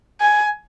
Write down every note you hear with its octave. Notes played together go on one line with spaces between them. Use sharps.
G#5